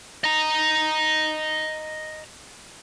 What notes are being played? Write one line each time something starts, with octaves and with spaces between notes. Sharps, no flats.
D#5 A#5